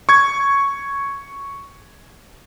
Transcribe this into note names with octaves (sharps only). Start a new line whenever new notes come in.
C#6 G#6